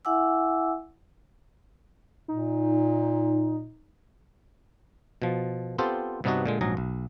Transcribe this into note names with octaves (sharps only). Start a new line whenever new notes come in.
E4 E5 F#5 G#5 D6 E6
A#2 D#4
B2 F3
B3 C4 F4 G4 A4 C5
G2 C3 B3 D4 D#4 F#4
A#2 D3 G#3
A#1 G#2 F#3 G#4 A#5
B1